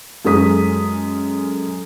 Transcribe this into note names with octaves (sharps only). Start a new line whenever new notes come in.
F#2 G#3 A4 D#6 B6